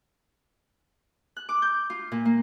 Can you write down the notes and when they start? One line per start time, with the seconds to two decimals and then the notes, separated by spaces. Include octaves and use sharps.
1.37 F#6
1.49 D6
1.62 G6
1.90 F4
2.12 A#2
2.25 A#3